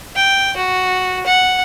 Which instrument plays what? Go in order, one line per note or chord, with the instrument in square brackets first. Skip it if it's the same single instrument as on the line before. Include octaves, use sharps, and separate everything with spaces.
[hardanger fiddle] G5
F#4
F#5